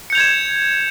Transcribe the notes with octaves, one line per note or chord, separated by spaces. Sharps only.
G6 G#6 C#7 E7 F7